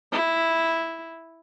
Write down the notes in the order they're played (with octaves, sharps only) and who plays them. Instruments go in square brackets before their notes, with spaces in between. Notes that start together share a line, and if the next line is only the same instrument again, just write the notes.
[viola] E4